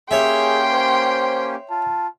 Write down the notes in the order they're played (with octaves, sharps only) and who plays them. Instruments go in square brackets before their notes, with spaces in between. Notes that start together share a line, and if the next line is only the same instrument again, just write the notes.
[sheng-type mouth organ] A#3 C#4 G4 [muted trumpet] G#4 [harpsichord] C#5 E5 [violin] G5 C6
[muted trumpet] C5
[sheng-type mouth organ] F4 [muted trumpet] A5